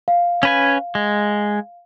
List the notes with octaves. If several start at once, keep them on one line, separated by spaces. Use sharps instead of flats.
F5
C#4 B4 G#5
G#3